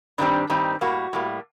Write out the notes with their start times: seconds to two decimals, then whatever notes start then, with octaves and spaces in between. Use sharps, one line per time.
0.18 G2 D#3 G3 C4 D4
0.50 G2 D#3 G3 C4 D#4
0.81 A2 G3 A#3 F#4
1.13 A2 G3 A#3